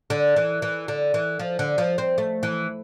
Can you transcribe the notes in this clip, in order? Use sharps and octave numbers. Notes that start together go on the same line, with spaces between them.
D3
E3
E3
D3
E3
F3
D3
F3
C4
A3
E3